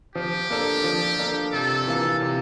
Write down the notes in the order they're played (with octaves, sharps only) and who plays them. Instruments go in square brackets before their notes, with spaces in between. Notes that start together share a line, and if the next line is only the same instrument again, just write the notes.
[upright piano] F3 [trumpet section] G4
[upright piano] A#3 D4 A4
F3
A#3 D4 A4
[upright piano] C3 [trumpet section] A4
[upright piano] E3 A#3 F4
C3